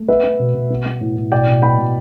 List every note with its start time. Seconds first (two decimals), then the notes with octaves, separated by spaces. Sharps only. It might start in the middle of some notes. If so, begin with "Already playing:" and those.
Already playing: A3
0.08 B3 B4 E5
0.24 B3
0.39 B2
0.54 B2
0.70 B3
0.86 B3
1.01 A2
1.16 A2
1.32 B2 D5 G5
1.47 B2
1.62 B3 G5 B5
1.78 B2